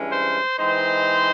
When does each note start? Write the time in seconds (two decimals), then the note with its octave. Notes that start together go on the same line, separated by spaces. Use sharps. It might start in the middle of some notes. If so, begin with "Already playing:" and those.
Already playing: G2 E3 G#3 C#4
0.11 C5
0.59 E3 G#3 C4 D#4 C5